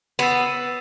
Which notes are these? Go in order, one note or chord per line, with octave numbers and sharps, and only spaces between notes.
B3 E6 A6 C7 E7